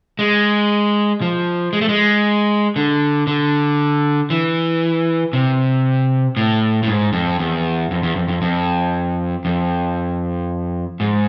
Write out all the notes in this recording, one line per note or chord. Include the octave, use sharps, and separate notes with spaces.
G#3
F3
G#3
A3
G#3
D3
D3
E3
C3
A2
A2
G#2
F2
E2
F2
E2
F2
F2
F2
F2
G#2